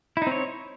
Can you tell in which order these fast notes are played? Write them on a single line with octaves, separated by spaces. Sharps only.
E4 D#4 C4 C#5